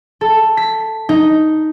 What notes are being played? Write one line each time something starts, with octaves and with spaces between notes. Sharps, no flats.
A4
B6
D#4